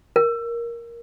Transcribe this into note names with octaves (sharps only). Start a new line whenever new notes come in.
A#4